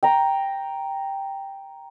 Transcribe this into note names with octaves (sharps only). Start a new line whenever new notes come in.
G5 A#5